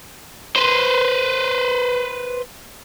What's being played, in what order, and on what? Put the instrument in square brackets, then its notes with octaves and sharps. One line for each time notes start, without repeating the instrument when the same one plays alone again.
[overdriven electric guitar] B4 C5